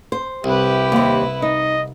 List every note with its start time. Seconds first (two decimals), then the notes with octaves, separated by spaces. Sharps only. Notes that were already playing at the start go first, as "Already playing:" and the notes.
0.12 C5
0.44 C2 E4 G4 B4
0.92 D#2 C3
1.42 D#4 D#5